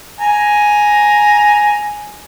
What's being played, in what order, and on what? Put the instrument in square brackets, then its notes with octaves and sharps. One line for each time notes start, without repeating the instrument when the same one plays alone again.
[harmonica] G#5 A#5